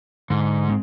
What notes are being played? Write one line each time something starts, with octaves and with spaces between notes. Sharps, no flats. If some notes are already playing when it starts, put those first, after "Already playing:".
G#2 D3
G#3 B3 C4